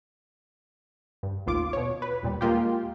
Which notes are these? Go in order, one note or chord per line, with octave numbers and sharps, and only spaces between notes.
G2
A1 D#2 F4 D6
B2 C#5
B4
D#2 A#2 G3
G#3 A#3 F4 G4